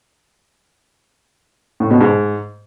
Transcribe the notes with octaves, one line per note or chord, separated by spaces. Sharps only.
A2
B2
G#2